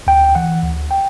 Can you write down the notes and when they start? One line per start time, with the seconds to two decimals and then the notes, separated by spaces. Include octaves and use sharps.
0.07 D2 G5
0.35 E3 F#5
0.63 D2
0.91 G5